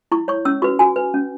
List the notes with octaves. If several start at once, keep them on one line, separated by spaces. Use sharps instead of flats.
E4 C#6
C#5 C#6
C#4 E6
F#4 B4 C#6
F#4 G#5
B4
C#4